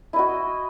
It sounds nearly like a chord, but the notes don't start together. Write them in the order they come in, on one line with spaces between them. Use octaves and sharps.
E4 D#5 F#4